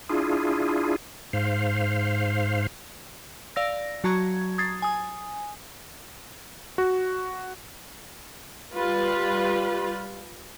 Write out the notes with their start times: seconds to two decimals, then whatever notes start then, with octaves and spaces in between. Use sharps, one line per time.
0.09 D4 E4 F4 G#4
1.33 G#2 C5 F5
3.56 D5 F5 E6 A#6
4.04 F#3 F#4 A5 A#5 C#6 G#6
4.58 D#6 G#6 A6 C7
4.82 G#5 D#6
6.78 F#4
8.72 G3 F4 B4